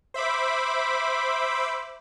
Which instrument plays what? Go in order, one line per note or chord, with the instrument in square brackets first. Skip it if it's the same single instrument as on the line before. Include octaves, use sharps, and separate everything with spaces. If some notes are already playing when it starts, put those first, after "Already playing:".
[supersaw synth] C5 E5 B5 D6